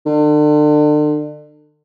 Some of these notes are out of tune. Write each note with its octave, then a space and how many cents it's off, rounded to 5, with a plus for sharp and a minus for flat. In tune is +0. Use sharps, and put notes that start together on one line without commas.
D3 +35